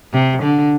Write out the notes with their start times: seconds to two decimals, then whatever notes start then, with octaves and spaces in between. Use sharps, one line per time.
0.13 C3
0.42 D3